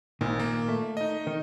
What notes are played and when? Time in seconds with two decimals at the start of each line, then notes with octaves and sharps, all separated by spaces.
0.21 G#1 A#2 D#3
0.39 A#3
0.68 A3
0.97 D#4 D#5
1.27 D#3